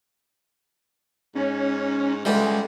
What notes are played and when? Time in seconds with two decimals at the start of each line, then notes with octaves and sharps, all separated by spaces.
1.35 G#2 C#4
2.25 C#2 D3 E3 G3 G#3